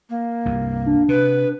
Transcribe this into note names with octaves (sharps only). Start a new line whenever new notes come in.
A#3
C2 G2
D4
C3 B4